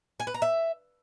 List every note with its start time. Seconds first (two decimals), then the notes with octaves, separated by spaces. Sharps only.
0.20 G#5
0.27 B4
0.34 A#5
0.42 E5